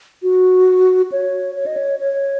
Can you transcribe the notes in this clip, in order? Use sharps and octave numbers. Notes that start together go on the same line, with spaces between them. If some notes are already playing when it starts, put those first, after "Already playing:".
F#4
C#5
C#5
D#5
C#5
C#5